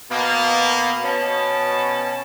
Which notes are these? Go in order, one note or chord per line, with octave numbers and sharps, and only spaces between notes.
B2 A#3
B2 C#4 A5